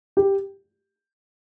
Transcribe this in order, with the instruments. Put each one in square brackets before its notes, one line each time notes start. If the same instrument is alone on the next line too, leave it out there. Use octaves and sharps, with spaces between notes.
[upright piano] G4